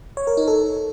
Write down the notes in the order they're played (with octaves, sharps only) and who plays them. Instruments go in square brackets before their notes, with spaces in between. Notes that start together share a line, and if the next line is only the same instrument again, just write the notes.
[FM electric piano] C#5
A#4
D#4
A4